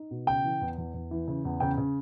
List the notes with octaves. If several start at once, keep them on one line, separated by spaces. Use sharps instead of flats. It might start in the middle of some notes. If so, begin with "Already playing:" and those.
Already playing: D#4
B2
C#3 G5
E3
E2
E2
E2
E3
C#3
E2
C#3 G5
C#3